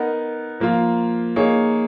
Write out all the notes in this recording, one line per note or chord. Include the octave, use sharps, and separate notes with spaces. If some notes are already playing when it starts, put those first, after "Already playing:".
Already playing: B3 D#4 A#4
F3 A#3 F4
A#3 D#4 G#4 C#5